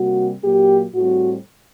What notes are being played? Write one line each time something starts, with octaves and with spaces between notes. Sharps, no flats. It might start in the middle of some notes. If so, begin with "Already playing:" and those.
Already playing: C3 G3 A#3 F#4
A#2 F#3 A#3 G4
A2 G3 C4 F#4